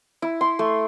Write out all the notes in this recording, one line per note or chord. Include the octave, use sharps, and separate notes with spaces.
E4
C6
A3